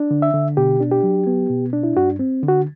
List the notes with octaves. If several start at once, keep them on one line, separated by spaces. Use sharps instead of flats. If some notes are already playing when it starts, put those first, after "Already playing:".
Already playing: D4
D3
E5
D3
B2 G4
D4
G4
F#3
B3
B2
D4
E4
G2 F#4
C4
D3
F#4